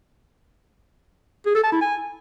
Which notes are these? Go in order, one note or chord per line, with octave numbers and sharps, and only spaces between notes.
G#4
A4
A5
E4
G#5